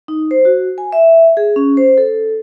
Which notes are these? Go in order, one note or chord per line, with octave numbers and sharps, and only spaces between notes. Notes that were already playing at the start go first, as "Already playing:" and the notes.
D#4
C5
F#4
G#5
E5
G#4
C#4
C5
A4